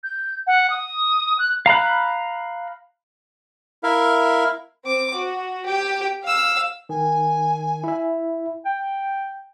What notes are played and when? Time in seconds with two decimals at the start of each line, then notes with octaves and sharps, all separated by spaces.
0.03 G6
0.47 F#5
0.70 D#6
1.39 F#6
1.66 F5 A#5 B5 F#6
3.83 E4 A#4 E5 F5
4.84 C4 D6
5.14 F#4
5.66 G4 G5
6.24 F5 E6
6.89 D#3 G#5
7.84 E4 E5
8.65 G5